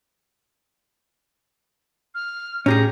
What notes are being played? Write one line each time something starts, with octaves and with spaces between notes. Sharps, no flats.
F6
A2 C#4 G4 G#4 A#5